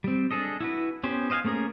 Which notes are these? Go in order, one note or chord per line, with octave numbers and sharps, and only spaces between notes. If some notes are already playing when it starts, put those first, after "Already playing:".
G3 C4
D4 G#4 A4 D#5
E4 F#4 B4
B3 C#4 G4 C5
C5 D#5 F5 F#5 G#5
A3 A#3 C#4 G#4 A#4